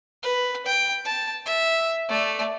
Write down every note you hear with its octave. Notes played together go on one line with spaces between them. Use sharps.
B4
G5
A5
E5
A3 D5